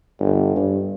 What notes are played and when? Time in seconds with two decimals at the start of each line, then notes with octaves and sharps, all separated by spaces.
0.20 G1
0.56 G2